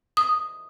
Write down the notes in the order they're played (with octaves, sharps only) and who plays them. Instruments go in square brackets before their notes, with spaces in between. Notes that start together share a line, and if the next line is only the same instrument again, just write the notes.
[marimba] D#6